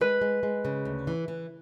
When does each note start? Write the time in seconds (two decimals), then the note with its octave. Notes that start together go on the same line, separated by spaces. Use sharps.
0.01 G#3 B4
0.21 G#3
0.43 G#3
0.65 C#3
0.85 D2
1.07 E3
1.28 E3